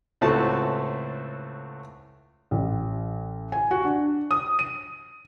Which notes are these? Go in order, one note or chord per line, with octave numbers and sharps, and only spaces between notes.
C#2 A2 A3 C4 F#4 A5
A1
G#5
F#4
D4
D#6
D#7